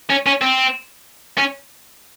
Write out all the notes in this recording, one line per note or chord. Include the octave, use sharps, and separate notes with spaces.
C#4
C#4
C4
C#4